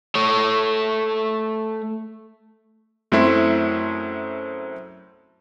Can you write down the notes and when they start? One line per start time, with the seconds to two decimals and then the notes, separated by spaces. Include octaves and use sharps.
0.15 A3 C#5
3.12 F#2 A3 C4 E4 E5 C6